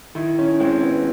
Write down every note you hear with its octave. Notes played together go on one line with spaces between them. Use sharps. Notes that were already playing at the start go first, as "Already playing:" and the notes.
D#3 E4
C#4
G#3 C4
B3